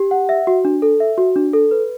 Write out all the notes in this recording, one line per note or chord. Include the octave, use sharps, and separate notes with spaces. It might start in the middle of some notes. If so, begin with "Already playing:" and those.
Already playing: G4
F#5
E5
F#4
D4
A4
E5
F#4
D4
A4
B4